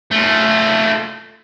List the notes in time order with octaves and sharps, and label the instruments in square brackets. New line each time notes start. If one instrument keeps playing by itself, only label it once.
[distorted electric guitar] A3 F4